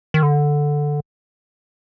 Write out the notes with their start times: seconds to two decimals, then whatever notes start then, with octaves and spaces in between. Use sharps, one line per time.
0.14 D#3
0.23 D3